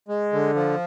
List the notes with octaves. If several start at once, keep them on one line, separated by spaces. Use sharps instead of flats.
G#3
D3
F3